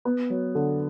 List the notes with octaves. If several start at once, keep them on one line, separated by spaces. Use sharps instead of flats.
B3
F#3
D3